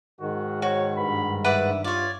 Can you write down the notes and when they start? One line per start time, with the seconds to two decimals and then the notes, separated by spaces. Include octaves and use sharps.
0.21 G#2 D#3 F#4
0.62 F#4 C#5
0.97 G2 B5
1.44 B4 D5 E5 F#5
1.84 F4 C#5 D5